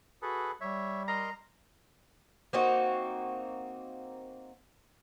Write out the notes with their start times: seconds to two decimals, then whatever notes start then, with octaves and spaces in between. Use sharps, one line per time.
0.22 F#4 G#4 A4 B4
0.61 G3 C#5 E5
1.08 A#4 D#5 A#5 C6
2.53 A#3 C4 D#4 F#4